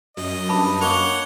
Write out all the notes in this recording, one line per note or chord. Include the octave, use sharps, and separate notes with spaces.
F#2 D#5
G2 A5 B5
A#3 C#5 F#5 F7 G7